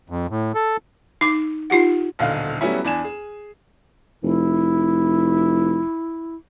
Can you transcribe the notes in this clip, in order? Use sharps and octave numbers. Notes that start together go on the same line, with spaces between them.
F2
A2
A4
D#4 D6
D#4 F4 G4 F#5
D#1 B1 D3 D#4 F5
F#3 G3 A3 B3 C#4 E4
E2 D4 G#5 E7
G#4
F1 E4